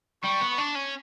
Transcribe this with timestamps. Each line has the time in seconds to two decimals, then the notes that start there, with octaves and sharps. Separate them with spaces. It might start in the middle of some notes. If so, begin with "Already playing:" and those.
0.24 G3 C#6
0.41 B3
0.59 D4
0.76 C#4